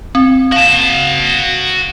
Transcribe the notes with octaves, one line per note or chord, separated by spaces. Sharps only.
C4
F#4 F5 A5